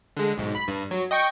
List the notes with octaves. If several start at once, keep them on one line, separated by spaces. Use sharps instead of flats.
D3 G#3
B1 G#2
B5
G2
F#3
D#5 G5 C#6